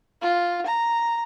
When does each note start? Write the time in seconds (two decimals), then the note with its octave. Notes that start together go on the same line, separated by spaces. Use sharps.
0.22 F4
0.66 A#5